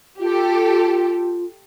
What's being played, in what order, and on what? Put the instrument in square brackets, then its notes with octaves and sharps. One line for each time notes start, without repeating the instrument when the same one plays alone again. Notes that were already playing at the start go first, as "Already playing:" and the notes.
[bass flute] F4 [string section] G4 A4